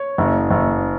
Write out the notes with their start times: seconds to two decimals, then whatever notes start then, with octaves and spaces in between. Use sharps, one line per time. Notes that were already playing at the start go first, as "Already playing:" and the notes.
Already playing: C#5
0.18 F#1
0.51 F#1